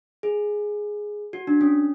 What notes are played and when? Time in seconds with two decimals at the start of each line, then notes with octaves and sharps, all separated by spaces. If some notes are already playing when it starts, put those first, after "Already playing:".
0.23 G#4
1.33 F#4
1.47 D4
1.61 C#4